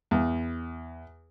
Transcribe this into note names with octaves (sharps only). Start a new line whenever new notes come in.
E2